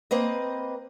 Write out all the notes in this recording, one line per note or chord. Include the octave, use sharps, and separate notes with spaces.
A#3 C4 B4 D#5